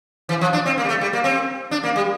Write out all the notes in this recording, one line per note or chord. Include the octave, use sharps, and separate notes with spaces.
E3
F3
D4
C4
A#3
G3
A3
G3
A#3
C4
D4
A#3
G3